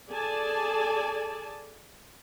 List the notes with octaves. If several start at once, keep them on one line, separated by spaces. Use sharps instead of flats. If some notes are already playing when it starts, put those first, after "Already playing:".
G#4 A4 D5 G#5 A5